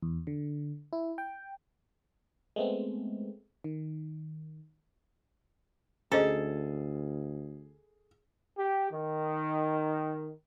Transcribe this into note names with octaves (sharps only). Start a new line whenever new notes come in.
E2
D3
E4
G5
G#3 A3 B3 C4
D#3
D2 C#4 G#4 A4 C5 D#5
G4
D#3